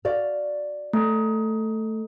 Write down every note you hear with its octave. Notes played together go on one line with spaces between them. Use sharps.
F#4 D5 F5
A3